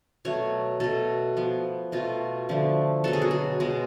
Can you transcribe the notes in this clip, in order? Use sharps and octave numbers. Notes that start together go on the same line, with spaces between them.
B2 F#3 A3 C#5
B2 A3 A4
F3 B3
B2 A3 F4
D3 F3 A3
B2 F#3 B3 A4
G#4
F#4
G#4
B2 G#3 B3